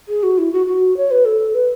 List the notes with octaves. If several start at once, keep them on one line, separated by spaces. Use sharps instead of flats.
G#4
F#4
E4
F#4
F#4
C#5
B4
A4
B4